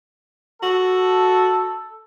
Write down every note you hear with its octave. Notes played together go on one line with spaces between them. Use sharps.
F#4 A4